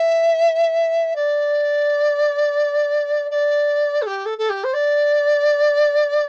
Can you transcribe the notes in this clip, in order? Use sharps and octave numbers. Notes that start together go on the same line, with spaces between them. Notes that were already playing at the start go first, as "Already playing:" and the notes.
Already playing: E5
D5
D5
A4
G4
A4
A4
G4
C5
D5